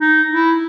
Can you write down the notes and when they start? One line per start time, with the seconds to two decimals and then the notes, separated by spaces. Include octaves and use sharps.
0.01 D#4
0.31 E4